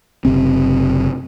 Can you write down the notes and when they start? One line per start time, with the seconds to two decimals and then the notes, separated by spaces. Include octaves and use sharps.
0.25 F#1 C3 C4